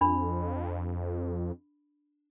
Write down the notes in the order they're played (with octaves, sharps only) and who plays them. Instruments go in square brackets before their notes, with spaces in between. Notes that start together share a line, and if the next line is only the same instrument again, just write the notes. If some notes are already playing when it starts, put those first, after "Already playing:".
[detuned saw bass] F2 [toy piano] D4 B5